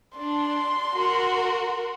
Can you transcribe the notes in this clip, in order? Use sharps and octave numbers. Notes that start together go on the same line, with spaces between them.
D4 C6
F#4 A#4